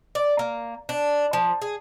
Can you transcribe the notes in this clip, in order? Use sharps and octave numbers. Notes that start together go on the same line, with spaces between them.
D5
A#3
D4
F3
G#4